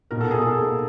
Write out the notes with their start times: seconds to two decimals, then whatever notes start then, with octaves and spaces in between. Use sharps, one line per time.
0.11 B2 A#4
0.21 A4
0.31 B2 G#4
0.42 A4
0.58 A#3